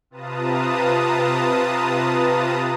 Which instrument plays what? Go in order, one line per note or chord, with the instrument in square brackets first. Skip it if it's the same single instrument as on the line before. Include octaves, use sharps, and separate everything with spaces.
[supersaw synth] C3 F4 B4 A5 A#5 D#6